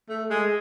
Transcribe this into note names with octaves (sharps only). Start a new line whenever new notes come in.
A3
G#3